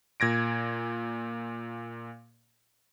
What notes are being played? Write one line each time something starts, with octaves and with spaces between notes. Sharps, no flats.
A#2 G#6 A#6 D7